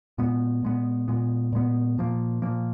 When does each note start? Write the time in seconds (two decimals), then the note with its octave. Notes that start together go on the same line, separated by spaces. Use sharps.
0.18 A#2 G#3 B3
0.63 A#2 G#3 B3
1.08 A#2 G#3 B3
1.53 A#2 G#3 B3
1.98 A#2 F3 A#3
2.42 A#2 F3 A#3